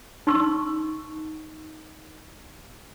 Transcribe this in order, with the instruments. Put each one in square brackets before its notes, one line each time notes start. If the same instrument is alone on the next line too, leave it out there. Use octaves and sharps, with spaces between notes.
[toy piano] D#4 C6 C#6 E6